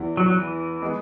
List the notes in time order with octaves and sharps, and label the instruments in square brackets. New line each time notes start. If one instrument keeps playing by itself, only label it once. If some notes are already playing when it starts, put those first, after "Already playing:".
Already playing: [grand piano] E2 E3 B3 E4
[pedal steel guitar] F#3
F#3
E3
[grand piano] G#3 B3 G#4